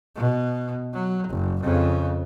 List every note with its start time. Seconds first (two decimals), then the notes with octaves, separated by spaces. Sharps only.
0.16 B2
0.93 F#3
1.28 F#1
1.62 F2 C#3